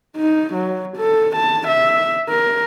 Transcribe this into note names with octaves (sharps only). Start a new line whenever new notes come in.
D#4
F#3
A4
A5
E5
A#4